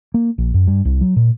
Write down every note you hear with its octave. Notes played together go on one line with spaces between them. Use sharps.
A#3
A#1
F#2
G2
C2
F#3
A#2